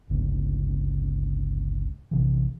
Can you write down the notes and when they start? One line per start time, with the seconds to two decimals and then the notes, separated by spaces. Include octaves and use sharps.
0.10 G1 C#2 G#2 C#3
2.11 A#1 C3 E3